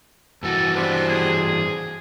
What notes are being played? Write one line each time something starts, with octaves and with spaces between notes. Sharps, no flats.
G2 E3 F#4 A4
B3 D4 G4 C5
G#4